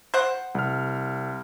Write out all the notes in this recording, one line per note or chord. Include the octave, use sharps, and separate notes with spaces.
C5 F#5
C2 F6